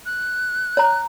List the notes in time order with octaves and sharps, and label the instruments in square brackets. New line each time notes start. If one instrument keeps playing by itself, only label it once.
[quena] F#6
[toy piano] C#5 A#5